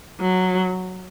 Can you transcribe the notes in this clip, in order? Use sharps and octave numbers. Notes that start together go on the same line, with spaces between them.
F#3